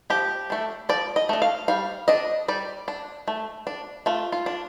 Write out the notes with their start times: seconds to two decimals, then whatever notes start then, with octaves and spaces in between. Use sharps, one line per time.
0.10 F3 G4
0.50 A3 D4
0.89 F3 D5
1.16 D#5
1.29 A3 D4
1.42 F5
1.68 G3 F5
2.08 D4 D#5
2.48 G3 D5
2.88 D4
3.28 A3
3.67 D4
4.06 A3 F4
4.32 F4
4.46 D4